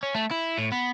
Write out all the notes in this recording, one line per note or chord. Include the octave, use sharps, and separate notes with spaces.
C#4
A3
E4
A2
B3